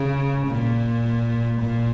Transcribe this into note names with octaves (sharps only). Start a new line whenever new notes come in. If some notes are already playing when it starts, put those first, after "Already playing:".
Already playing: C#3
A#2
A#2